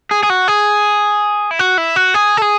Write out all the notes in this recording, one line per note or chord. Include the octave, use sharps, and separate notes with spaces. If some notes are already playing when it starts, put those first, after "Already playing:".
G#4
G#4
F#4
G#4
E4
F#4
E4
F#4
G#4
A4
G#4